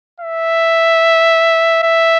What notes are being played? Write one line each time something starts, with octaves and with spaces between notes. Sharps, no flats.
E5
E5